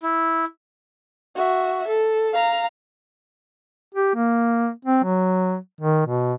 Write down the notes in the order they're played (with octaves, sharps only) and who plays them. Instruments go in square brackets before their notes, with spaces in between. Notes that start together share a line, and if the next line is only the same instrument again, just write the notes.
[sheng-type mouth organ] E4
[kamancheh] F#4 E5
A4
F5 A#5
[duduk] G4
A#3
C4
F#3
D#3
B2